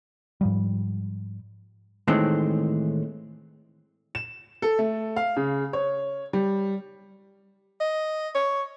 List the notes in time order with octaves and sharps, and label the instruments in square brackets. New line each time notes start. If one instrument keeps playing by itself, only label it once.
[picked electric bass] G#2 F3 G3
[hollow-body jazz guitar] A2 D#3 E3 G#3 A3 C4
[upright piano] E7
A4
A3
F5
C#3
C#5
G3
[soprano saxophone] D#5
C#5